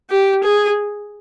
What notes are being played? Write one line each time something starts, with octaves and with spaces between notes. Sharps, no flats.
G4
G#4